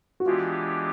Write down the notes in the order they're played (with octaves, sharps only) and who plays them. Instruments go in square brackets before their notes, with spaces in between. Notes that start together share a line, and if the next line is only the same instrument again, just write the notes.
[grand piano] F#4
[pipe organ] E3 G#3 B3 D4 G4 [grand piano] F4